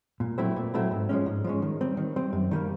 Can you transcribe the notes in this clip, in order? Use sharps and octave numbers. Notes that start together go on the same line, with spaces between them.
A#2
F#3 A3 C4 E4
A#2
F#3 A3 C4 E4
G#2
F3 G#3 C#4
G#2
F3 G#3 C#4
D#3
G3 C4
D#3
G3 C4
F#2
D#3 G3 A#3